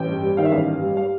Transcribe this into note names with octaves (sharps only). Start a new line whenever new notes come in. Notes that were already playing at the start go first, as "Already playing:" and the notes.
Already playing: A1 G5
G2
G3
D#3 F5
E5
A1 F5
G2
G3
G3 F5